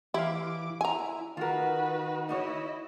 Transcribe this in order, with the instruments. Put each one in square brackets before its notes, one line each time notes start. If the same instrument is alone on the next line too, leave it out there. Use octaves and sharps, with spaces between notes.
[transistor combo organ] E3 D6 [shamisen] E4 [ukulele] G4 F5
[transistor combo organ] E4 [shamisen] G#5 A#5
[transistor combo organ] D#3 [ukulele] F4 A#4 [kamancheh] F#4 B4
[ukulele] D#4 F#4 C#5 [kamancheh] E4 D#5